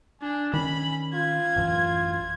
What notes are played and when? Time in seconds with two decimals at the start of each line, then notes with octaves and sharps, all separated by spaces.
0.22 D4 G#5
0.53 D#3 C#4 B5
1.14 F4 G#6
1.56 A1 F#2 E3